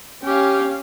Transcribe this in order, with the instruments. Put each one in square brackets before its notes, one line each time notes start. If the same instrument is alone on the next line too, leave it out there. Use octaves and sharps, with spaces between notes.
[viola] C#4 F5 [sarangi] G4